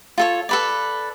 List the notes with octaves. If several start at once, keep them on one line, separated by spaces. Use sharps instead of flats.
F4 A4 C#5
A4 B4 D5